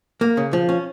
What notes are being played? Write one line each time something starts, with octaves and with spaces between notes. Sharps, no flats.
A#3
C#3
F3
C#4